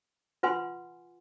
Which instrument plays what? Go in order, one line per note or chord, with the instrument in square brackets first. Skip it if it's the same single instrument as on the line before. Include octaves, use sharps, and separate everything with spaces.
[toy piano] F4 B4 F#5 G#5 C6